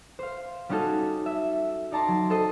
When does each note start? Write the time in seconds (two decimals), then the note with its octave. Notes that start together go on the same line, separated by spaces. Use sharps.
0.19 C5 F5
0.69 G3 C#4 D#4 F#4 A4
1.26 E5
1.92 D#4 D5 A5 A#5 C6
2.08 F#3
2.30 A4 C5 D#5 C6